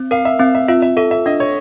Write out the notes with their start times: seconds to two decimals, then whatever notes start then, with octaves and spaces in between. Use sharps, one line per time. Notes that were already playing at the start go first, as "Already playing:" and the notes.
Already playing: C4
0.11 A#4 F5
0.25 E5
0.39 C4 F5
0.55 E5
0.68 F4 E5
0.82 E5
0.97 A4 E5
1.11 E5
1.26 D4 D#5
1.40 C#5